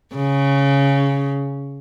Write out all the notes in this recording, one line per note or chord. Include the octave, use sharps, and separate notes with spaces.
C#3